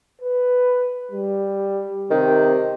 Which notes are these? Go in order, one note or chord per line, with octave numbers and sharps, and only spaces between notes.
B4
G3
C3 D#3